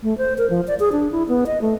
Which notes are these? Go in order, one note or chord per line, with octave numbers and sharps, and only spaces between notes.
A3
C5
A#4
F3
D5
G#4
D4
E4
B3
D#5
A3